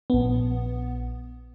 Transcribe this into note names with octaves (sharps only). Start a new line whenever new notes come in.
A#1 B3